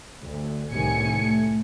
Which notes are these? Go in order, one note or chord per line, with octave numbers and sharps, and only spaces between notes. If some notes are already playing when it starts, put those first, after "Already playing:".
D2
C2 A2 C3 D#3 G#5 C#7
A3